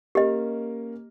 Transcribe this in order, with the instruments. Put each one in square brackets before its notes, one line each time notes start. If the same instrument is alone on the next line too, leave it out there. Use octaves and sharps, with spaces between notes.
[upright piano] A#3 C#4 A#4 [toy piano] G4 D#5